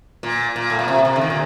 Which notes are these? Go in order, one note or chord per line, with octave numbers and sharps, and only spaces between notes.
A#2
A#2
A2
A#2
C3
C3
D3
D#3
A#2